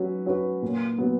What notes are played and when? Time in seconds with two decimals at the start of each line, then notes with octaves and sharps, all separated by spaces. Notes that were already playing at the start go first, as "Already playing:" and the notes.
Already playing: F#3 C#4 F#4 B4
0.26 C#4 F#4 B4
0.62 A#2
0.98 F#3 B3